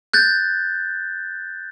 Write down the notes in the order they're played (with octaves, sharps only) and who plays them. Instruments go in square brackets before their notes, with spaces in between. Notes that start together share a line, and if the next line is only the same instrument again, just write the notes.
[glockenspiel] F#6 G6 A6